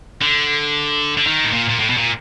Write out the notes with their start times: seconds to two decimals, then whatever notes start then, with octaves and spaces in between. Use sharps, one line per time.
0.22 D3
1.17 D3
1.26 D#3
1.44 A2
1.52 A#2
1.69 A#2
1.79 A2
1.89 B2
1.97 A#2